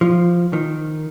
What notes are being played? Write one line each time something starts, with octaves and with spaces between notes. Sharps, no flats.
F3
D#3